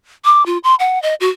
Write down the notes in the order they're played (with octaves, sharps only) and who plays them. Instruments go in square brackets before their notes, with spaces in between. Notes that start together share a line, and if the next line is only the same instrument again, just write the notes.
[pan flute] D6
F4
C6
F#5
D#5
F#4